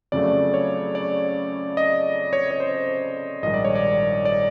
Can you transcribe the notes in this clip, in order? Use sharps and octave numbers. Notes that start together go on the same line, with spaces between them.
F2 C#3 F#3 A3 D5
C#5
D5
D#5
C#5
C#5
C5
A#1 G#2 D#3 G3 D#5
D5
C#5
D5
D5